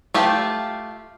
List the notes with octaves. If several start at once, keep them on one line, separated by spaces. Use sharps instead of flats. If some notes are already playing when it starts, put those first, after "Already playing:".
A3 F4 G4